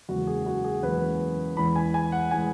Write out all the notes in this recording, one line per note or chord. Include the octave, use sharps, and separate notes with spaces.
F#1 E2 C#3 E3 G#3 F#4
G#4
F#4
G#4
F#1 E2 C#3 E3 G#3 B4
E2 E3 G#3 B5
G#5
G#5
F#5
E3 G#3 G#5